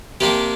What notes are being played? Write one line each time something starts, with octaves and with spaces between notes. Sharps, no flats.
C3 A#3 D4 G4